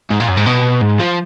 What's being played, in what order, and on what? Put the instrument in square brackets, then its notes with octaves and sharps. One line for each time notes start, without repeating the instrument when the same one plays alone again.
[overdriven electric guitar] G#2
A#2
F#2
G#2
B2
G#2
F3